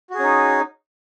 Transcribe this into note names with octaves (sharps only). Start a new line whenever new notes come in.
C#4 D#4 F#4 G#4